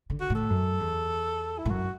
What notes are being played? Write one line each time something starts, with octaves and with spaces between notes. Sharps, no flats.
D3
F#4
A2
A4
F#2
E2
E4
A2
F#2 F#4